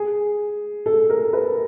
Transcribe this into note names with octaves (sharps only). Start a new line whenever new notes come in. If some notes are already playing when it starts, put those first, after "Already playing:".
Already playing: G#4
A4
A#4
B4